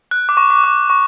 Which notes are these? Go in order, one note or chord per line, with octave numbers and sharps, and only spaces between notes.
F#6
D6
C#6
D6
D6
C#6